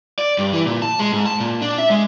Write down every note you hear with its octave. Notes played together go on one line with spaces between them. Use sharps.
D5
G2
E3
A#2
A5
G#3
G#2
A5
A#2
D4
E5
G#3